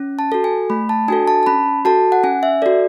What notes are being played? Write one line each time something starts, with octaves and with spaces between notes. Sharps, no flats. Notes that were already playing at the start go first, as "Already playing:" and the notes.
Already playing: C#4
A5
F#4 A4
G#5
A3 B5
A5
D4 F#4 A4 G#5
A5
A5
C#4 B5
F#4 A4 A5
F#5
C#4 G#5
E5
F#4 A4 D5